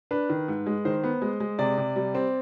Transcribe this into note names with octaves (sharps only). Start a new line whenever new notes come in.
D4 B4
D#3
G#2
G#3
D#3 C5
B3
G#3
G#3
C3 D5
C3
G3
C4